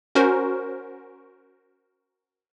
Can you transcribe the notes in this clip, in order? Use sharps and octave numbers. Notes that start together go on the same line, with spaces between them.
C#4 F#4 A#4 C5